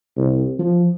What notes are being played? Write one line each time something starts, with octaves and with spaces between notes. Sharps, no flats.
C2
F3